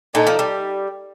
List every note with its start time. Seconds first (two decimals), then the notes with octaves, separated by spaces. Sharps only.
0.14 A#2 D#4 A4 D5
0.27 F3
0.39 G3